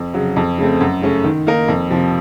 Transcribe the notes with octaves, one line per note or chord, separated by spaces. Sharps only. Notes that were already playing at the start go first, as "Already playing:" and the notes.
Already playing: F2
C#3 F#3
F2
C#3 A3 C4
F#2
C#3 A3 C#4
D#3
A#3 D#4 A#4
F2
C3 F3